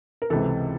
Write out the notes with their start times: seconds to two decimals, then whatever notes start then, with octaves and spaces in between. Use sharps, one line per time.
0.22 A#4
0.30 C#2 C3 E3 A4